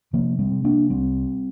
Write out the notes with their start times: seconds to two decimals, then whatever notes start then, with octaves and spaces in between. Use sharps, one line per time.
0.13 C3 F3 A#3
0.39 G3 C4
0.52 C3
0.64 A#3 D4
0.90 C2 G3 C4